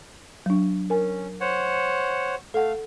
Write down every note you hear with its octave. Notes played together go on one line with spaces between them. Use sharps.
F#3 D4
C#4 A#4 G#5
C5 C#5 F#5
A3 A4 F5 F#5